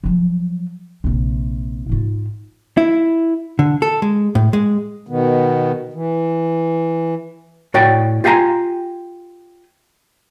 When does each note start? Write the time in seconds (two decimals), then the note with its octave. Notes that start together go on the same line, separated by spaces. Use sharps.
0.04 F3 F#3
1.04 A#1 C3
1.89 G#2 F4
2.77 E4
3.59 D3
3.82 A4
4.02 G#3
4.35 A2
4.53 G#3
5.07 B2 D#3 B3
5.93 E3
7.74 A2 F#4 C#5 D5 G5
8.24 F4 G4 F5 G#5 A#5 C6